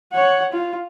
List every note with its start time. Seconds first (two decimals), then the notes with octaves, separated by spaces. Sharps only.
0.12 C#5 F#5
0.53 F4